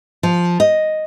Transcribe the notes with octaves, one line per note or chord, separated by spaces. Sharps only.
F3
D#5